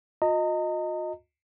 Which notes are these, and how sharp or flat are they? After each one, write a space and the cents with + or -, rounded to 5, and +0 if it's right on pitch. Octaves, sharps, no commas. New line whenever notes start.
F4 +45 D#5 +0 A#5 -35